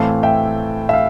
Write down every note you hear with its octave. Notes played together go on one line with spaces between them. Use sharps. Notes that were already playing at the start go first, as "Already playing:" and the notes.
Already playing: A2 E3 A3 C4 F5 A5
E5 G5
E5
F5